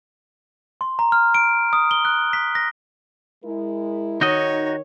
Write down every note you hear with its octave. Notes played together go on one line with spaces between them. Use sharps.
C6
A#5
F6
D7
D#6
G7
F#6
B6
A#6
G#3 E4 A#4
D#3 D#4 F#4 C#5 D#5